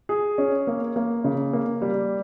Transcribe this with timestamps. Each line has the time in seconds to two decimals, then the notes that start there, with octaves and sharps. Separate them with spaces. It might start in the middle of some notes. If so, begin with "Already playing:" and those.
0.09 G#4
0.38 C#4
0.67 A#3
0.96 A#3
1.24 C#3
1.53 A#3
1.82 G3